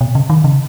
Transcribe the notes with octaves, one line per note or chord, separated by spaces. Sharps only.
B2
C#3
D#3
C#3